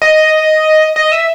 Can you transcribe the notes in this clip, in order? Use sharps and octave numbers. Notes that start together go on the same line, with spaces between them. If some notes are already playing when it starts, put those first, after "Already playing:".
D#5
D#5
E5